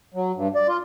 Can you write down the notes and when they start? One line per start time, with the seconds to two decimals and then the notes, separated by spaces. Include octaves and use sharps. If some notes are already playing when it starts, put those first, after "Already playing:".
0.14 F#3
0.36 G2
0.55 D5
0.68 F4